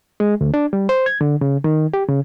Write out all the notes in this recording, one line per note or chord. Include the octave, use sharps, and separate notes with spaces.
G#3
D2
D4
G3
C5
G#6
D3
C#3
D#3
G4
C#3